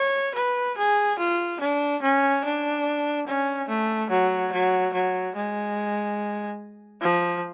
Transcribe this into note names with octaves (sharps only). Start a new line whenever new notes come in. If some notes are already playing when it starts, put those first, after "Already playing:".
Already playing: C#5
B4
G#4
F4
D4
C#4
D4
C#4
A3
F#3
F#3
F#3
G#3
F3